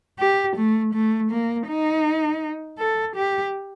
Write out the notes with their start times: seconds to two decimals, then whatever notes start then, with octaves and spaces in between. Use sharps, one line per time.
0.19 G4
0.56 A3
0.94 A3
1.31 A#3
1.68 D#4
2.79 A4
3.16 G4